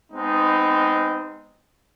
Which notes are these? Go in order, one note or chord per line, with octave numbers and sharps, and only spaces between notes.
G#3 B3 C4 D#4